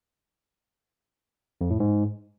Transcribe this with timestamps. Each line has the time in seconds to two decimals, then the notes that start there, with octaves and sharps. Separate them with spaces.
1.61 F2
1.70 A2
1.80 G#2